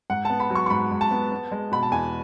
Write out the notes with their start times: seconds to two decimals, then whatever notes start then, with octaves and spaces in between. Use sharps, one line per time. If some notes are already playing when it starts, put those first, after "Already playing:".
0.10 G#2 F#5
0.25 B3 A5
0.40 B5
0.50 F#3
0.55 C#6
0.66 C#6
0.70 G#2 B5
0.91 G#2
1.01 A5
1.11 B3
1.32 B3
1.52 G#3
1.72 B2 B5
1.83 A5
1.92 E2 G#5